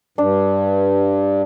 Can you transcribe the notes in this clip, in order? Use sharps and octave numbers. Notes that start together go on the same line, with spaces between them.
G2 D4